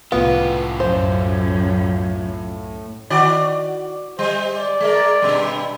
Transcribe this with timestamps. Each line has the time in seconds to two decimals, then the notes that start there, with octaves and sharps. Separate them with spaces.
0.12 C2 A2 B3 F4 G4 F5
0.80 F#2 C#4 C5
3.10 D#3 F#4 D5
4.19 G3 C5
4.52 D5
4.81 G#3 A#4
5.22 G2 B2 G3